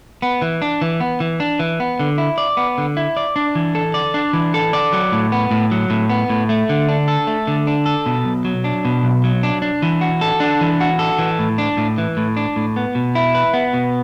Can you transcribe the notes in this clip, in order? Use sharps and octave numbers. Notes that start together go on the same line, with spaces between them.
B3
E3
D4
E3
B3
E3
D4
E3
B3
D3
E4
D5
B3
D3
E4
D5
D4
E3
A4
D5
D4
E3
A4
D5
F#3
A2
B3
A2
F#3
A2
B3
A2
A3
D3
D4
A4
A3
D3
D4
A4
B2
B1
F#3
D4
B2
B1
F#3
D4
D4
E3
F#4
A4
D4
E3
F#4
A4
E3
A2
D4
A2
E3
A2
D4
A2
B3
B2
E4
B4
B3
B2